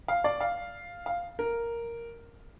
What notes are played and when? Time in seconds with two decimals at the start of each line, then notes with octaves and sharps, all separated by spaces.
0.08 F5
0.24 D5
0.41 F5
1.06 F5
1.39 A#4